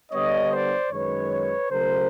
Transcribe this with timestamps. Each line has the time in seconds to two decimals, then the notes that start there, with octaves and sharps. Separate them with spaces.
0.12 D3 G3 B3 D4 C#5 D#5
0.52 C5 D5
0.91 F#2 D#3 G#3 B4 C#5
1.70 C#3 F#3 A3 A#4 C5